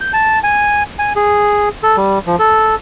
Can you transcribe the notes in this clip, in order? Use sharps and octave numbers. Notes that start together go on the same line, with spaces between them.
G6
A5
G#5
G#5
G#4
A4
G3
F3
A4